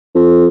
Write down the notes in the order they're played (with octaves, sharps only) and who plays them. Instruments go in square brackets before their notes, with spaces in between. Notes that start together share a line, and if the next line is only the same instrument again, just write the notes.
[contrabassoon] F2